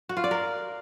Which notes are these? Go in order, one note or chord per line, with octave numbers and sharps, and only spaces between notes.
F#4
F4
D5
A#4